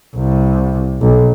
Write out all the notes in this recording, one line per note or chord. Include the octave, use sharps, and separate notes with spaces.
C2
B1